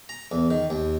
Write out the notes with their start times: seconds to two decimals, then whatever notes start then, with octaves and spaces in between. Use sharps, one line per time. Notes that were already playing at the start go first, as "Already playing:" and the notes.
0.09 A#5
0.31 E2
0.50 D#3
0.70 D#2